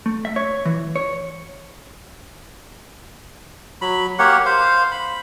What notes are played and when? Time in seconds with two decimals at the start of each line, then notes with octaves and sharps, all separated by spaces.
0.06 A3
0.25 E5
0.36 C#5
0.65 E3
0.96 C#5
3.81 F#3 B5
4.19 A#3 G4 C#5 F#5
4.45 C5 F5
4.91 B5